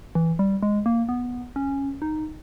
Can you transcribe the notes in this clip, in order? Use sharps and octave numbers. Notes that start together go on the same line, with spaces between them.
E3
G3
G#3
A#3
B3
C#4
D#4